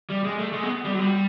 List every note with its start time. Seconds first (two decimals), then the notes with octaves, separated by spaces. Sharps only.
0.10 G3
0.24 G#3
0.38 A3
0.53 G#3
0.63 B3
0.85 G3
0.93 F#3
0.99 G3